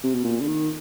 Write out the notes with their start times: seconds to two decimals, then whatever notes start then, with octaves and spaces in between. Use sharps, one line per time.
0.04 C3
0.13 B2
0.24 A#2
0.40 D3
0.47 D#3